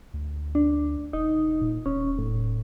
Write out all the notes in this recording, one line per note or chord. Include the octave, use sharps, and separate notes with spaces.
D2
D4
E1 D#4
A#2
D#1 C#4
A2